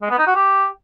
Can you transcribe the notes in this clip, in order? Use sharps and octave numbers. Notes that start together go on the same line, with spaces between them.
G#3
B3
D#4
F#4
G4